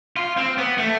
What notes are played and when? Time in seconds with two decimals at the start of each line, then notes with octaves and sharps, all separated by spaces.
0.17 F4
0.37 C4
0.58 B3
0.78 A3